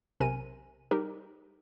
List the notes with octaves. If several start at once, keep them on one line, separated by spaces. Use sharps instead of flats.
B1 C3 A#4 G#5 D#7
G3 D#4 G4 A#4